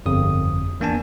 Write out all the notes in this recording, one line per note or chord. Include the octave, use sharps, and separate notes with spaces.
G1 F2 D#6
E2 A#3 D4 G#5 A5